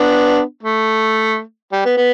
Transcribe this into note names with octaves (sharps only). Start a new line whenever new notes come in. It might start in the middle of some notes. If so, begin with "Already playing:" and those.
Already playing: B3 D4
A3
G3
B3
B3